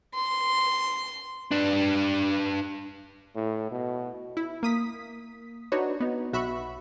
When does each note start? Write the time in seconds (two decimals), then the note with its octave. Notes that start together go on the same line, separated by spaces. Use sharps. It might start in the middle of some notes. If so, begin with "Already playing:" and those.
0.15 C6
1.52 D4 B4
3.35 A2
3.71 B2
4.37 E4
4.63 A#3 D#6 B6
5.72 D4 D#4 F#4 B4 C#5
6.00 B3 D#4
6.33 B1 F#4 E5 B5 C#6